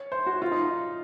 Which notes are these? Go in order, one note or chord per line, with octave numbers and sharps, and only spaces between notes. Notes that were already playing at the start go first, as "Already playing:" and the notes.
Already playing: C#5
C5
F#4
F4
D#4